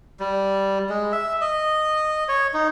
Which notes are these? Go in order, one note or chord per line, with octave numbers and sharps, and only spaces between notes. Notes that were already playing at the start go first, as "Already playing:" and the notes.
G3
G#3
E5
D#5
C#5
D#4